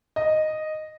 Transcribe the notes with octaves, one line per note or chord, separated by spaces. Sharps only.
D#5